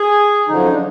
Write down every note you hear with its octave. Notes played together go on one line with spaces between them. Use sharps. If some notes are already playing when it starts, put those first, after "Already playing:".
Already playing: G#4
F#2 D3 F3 D#4
D4